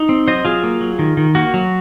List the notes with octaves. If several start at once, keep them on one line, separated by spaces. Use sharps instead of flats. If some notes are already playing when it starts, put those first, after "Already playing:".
Already playing: D#4
C4
F#3 C5 D#5
F#3 F4 G#4
A#3
F#3
D#3
D#3
A#3 F#4
F#3